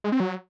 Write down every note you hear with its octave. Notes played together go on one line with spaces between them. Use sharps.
G#3
C4
F#3